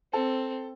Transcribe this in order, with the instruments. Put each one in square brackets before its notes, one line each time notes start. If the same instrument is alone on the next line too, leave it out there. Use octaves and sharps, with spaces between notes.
[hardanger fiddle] C4 [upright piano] A4